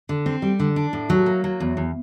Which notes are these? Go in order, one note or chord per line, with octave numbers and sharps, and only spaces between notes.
D3
C4
G3
D3
D4
A2
F#3
A#3
F#3
E2
E2